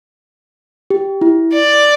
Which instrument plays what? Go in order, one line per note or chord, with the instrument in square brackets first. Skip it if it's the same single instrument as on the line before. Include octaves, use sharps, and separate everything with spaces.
[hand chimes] G4
E4
[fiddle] D5